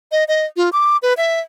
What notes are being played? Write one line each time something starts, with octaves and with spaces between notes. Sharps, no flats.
D#5
D#5
F4
D6
B4
E5